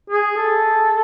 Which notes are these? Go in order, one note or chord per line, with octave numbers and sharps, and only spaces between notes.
G#4
A4